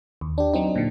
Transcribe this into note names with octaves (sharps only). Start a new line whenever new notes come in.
D#2
D4 G4
F#3 C4 D#4
A#2 D3